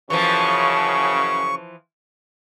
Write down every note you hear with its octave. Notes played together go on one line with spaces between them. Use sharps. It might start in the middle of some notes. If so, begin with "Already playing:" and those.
F#2 C#3 E3 F3 C#6